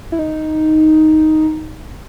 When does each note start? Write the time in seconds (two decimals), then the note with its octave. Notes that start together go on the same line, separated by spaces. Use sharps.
0.12 E4
0.19 D#4